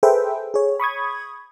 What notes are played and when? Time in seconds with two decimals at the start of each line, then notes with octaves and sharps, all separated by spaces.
0.03 G#4 A4 B4 C5 E5 G5
0.54 G#4 C#5
0.80 B5 C#6 D#6 G#6